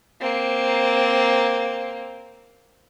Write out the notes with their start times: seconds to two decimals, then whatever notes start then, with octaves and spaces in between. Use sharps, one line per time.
0.21 A#3 C4